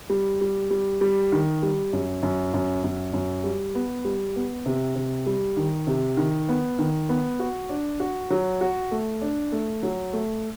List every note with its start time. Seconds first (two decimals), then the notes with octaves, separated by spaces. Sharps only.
0.10 G3
0.41 G3
0.70 G3
1.01 G3
1.32 D#3
1.63 G3
1.93 F#2
2.23 F#2
2.54 F#2
2.84 F#2
3.13 F#2
3.44 G3
3.75 B3
4.05 G3
4.36 B3
4.66 C3
4.96 C3
5.26 G3
5.57 D#3
5.87 C3
6.17 D#3
6.49 B3
6.79 D#3
7.09 B3
7.40 F#4
7.69 D4
8.00 F#4
8.30 F#3
8.61 F#4
8.91 A3
9.22 D4
9.52 A3
9.83 F#3
10.13 A3